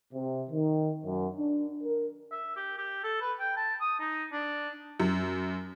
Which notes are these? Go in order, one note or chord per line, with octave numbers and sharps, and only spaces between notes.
C3
D#3
F#2
D4
A#4
E5
G4
G4
A4
B4
G5
A5
D#6
D#4
D4
F#2